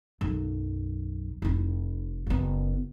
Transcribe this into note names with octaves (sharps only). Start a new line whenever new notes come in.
B1 F#2
F1 E4
F#1 B3